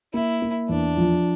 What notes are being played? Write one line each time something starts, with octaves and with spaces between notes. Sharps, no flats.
A#3 E4
A#3
E2 D4
F3